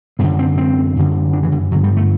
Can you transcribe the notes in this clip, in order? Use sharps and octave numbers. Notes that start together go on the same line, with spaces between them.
F#2 D3 B3
C4
C4
F#2 D3
D4
E3
D3
G2 D3 F#3
G3
A3